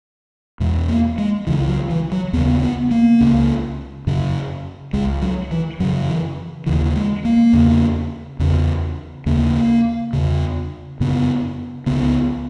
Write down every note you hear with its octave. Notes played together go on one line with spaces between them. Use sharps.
E2 B2 G#3
A#3
G#3
C#2 C#3 E3
F#3
E3
F#3
D#2 C#3 B3
B3
A#3
C#2 C#3
F#2 C#3
C#2 C#3 G#3
F#3
E3
F#2 C#3 F#3
E3
D#2 C#3 E3
G#3
A#3
E2 C#3
E2 C#3
D#2 C#3 A#3
E2 C#3
F#2 C#3 B3
C#2 C#3 B3